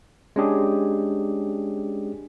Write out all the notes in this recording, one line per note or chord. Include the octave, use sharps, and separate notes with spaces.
G#3 C#4 D4 G4 G#4